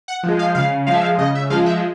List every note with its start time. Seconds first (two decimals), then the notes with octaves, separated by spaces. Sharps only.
0.08 F#5
0.23 F3 G#3
0.39 F5
0.55 C#3 F5
0.87 F3 G#3 F5
0.94 E5
1.01 F5
1.18 C#3 D#5
1.35 E5
1.50 F3 G#3 F5
1.66 E5